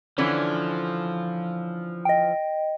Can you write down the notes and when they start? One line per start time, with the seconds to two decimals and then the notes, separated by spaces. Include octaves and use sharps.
0.18 D3 E3 F3 C#4
2.05 D#5 G5